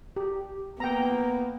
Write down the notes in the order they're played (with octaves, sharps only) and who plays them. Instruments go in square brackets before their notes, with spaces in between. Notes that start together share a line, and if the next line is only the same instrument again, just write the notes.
[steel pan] G4
[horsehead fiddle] A#3 [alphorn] B3 [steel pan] G5 A#5